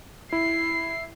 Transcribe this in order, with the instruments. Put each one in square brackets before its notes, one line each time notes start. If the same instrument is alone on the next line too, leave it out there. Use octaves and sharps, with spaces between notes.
[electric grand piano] E4 [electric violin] C7